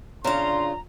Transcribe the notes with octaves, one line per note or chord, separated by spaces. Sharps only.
C#3 D4 E4 F4 C#5 A#5 C6